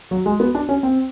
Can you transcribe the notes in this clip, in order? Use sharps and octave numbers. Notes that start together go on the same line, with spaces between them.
F#3
G#3
B3
D4
C#4
C4